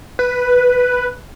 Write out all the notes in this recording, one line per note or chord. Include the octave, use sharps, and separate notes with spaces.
B4